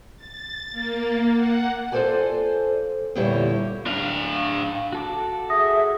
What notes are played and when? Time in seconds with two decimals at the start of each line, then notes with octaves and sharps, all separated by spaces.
0.16 A6
0.71 A#3
1.34 F#5
1.92 F4 A4 A#4 C5 D5 G#5
3.15 E2 A#2 D3 G3 E4 C#5
3.86 D4 F5
4.93 F#4 A4 D6
5.50 G#4 E5 D#6 A#6